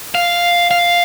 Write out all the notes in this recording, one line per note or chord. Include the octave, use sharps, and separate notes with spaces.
F5
F5